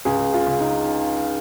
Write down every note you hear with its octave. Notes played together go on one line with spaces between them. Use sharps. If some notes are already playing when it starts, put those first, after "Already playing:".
C#2 G#4
F4
C#3
D#4